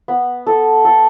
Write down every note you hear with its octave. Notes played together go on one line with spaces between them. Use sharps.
B3
A4
A4